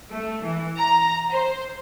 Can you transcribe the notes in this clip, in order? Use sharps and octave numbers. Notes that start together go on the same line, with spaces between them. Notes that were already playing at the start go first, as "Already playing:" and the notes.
A3
E3
A#5
C5